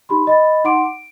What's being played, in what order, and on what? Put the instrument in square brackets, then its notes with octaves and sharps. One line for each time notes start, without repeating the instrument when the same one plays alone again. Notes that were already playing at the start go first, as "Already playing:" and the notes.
[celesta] D#4 G4 B5 C6
D#5 B5 A6
D#4 F#5 C6 D6 D7
D7